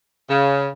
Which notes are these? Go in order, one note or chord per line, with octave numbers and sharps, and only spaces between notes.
C#3